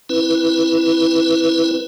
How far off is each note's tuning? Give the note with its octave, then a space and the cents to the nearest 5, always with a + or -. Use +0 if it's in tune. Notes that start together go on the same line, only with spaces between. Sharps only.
C4 +35 E4 +0 B4 +0